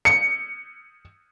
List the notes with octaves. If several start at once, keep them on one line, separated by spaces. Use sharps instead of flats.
C#7